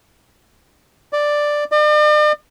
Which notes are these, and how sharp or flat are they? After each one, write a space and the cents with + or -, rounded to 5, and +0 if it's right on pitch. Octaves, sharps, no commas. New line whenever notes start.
D5 +5
D5 +45